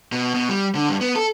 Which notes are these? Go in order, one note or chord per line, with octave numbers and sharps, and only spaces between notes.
B2
B2
G3
D3
G2
B3
A4